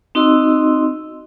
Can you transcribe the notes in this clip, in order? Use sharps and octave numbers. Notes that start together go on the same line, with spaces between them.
C4 D#4 F#4 D#5 C6 E6